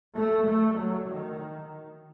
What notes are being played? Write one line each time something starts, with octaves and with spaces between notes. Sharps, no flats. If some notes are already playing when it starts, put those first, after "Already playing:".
A3
A3
F#3
D#3